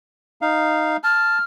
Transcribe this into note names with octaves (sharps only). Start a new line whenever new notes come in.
D#4 F5
A5 F6